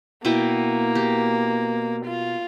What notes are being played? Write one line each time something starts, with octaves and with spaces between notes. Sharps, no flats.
B2 A#3 E4 G5
G4
F4